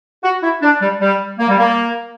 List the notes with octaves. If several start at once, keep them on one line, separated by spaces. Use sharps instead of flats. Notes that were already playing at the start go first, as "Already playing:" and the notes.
F#4
E4
D4
G3
G3
A#3
G3
A#3